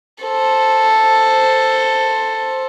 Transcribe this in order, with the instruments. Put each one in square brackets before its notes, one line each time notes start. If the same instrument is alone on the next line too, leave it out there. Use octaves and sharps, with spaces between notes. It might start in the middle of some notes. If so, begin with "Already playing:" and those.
[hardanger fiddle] A4 C5